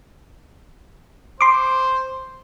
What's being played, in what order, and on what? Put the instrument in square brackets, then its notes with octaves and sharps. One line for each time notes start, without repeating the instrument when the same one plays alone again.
[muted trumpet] C5 [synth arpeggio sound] C6 D6